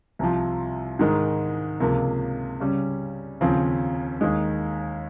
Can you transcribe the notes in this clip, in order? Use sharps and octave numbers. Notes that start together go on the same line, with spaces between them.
C2 C3 F3
G#2 D#3 G#3
C#2 C3 F3 A#3
C#3 G3 C#4
D#2 C#3 F3 C4
D#2 D#3 G#3